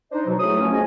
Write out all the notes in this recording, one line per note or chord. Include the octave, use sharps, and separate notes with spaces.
D4 D#4 C5 D#5
B2 F#3
C#2 A2 A3 E4 G#4 D#6
F3 F#3 A3 B3 C#4
G#2 D#5 G#5